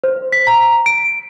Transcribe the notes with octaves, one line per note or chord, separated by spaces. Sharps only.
C5
B6
A#5
D7